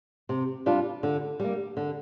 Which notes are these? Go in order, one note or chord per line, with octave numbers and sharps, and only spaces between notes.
C3
G3 D4 F4
D3
G3 A#3
D3